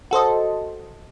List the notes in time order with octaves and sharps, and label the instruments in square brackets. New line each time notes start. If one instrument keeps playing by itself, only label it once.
[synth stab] F#4 A4 C5 D#5